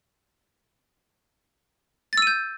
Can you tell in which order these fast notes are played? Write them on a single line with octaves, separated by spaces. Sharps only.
A6 E6 D#7 G6